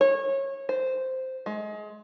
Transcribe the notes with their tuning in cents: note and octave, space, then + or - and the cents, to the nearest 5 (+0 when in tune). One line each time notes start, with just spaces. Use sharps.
C#5 -25
C5 -5
G#3 +25